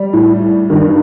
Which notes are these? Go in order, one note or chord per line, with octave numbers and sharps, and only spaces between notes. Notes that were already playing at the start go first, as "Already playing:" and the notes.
Already playing: G3
A2
G2 D#3